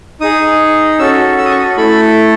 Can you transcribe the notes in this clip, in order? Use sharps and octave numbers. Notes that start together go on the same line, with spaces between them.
D#4 G#4 D#6
C#4 F#4 A4 E6
E6
D#6
C#6
D#6
A3 E4 A4 B5